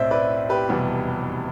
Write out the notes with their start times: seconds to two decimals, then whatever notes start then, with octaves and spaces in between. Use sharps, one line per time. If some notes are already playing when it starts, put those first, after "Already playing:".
Already playing: B1 A2 C4 C5 D5 E5
0.11 B4 D5
0.49 G4 B4
0.69 F1 E2 B2 G3 B3